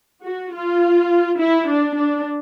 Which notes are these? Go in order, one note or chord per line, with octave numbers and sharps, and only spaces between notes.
F#4
F4
E4
D4
D4